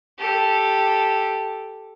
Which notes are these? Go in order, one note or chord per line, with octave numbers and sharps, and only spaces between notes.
G4 A4